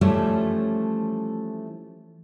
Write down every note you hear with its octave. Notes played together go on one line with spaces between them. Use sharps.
E3 F3 G3 A3 C#4